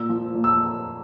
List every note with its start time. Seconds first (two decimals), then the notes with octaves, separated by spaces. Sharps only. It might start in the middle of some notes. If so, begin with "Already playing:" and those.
Already playing: A#2 E6
0.09 F3
0.35 A#2
0.44 E6